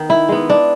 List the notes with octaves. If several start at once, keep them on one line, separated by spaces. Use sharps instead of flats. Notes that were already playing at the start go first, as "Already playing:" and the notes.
Already playing: D#3 B3
E4
G#3 B3
D4